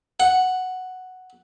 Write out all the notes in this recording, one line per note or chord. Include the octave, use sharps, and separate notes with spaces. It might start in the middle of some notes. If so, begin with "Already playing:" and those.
F#5